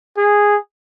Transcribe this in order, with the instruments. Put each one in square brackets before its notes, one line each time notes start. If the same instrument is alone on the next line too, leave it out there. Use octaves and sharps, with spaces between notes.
[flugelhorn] G#4